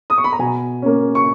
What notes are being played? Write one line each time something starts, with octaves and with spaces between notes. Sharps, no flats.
D#6
C#6
B5
A#5
B2 G#5
A#3 C#4
C#6